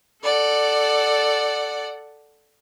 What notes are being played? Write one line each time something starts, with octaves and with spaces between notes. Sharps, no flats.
A4 D5 F#5